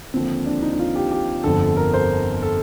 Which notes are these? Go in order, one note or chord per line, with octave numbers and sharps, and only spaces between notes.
D#2 D3 F3 C4
D4
D#4
D#4
F4
G4
G4
G1 F2 D3 A4
A#4
C5
A4